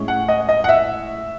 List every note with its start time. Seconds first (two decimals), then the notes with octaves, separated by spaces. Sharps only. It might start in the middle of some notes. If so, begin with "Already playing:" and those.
Already playing: A2 G#3 C#4
0.08 F#5
0.29 D#5
0.49 D#5
0.64 F#5
0.69 E5